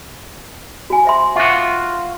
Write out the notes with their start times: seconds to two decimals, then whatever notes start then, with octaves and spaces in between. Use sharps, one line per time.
0.90 F#4 G#5
1.05 C5 E5 C6
1.36 F4 F#4 E5 D6